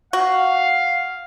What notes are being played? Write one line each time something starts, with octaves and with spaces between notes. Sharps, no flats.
F#4 F5